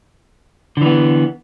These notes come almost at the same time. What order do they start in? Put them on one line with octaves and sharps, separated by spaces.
D3 E3 B3